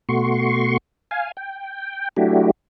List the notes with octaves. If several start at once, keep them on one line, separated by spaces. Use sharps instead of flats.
B2 A3 F#4 C6 C#6
F5 G#5
G5
F#3 A3 D4 E4 F#4 G4